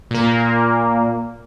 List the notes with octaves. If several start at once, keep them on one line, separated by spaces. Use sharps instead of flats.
A#2 A#3